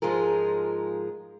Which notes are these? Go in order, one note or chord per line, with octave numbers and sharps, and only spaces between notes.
G#2 F3 G#3 F4 G#4 A#4